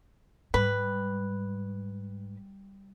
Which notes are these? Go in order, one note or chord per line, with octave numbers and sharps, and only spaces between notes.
G#2 G3 B4